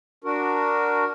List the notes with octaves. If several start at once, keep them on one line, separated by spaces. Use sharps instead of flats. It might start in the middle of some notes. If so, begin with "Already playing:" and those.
D4 F#4 A#4